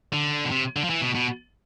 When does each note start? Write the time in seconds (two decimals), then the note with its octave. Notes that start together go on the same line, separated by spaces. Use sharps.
0.13 D3
0.45 B2
0.51 C3
0.76 D3
0.84 F3
0.90 E3
1.02 B2
1.15 B2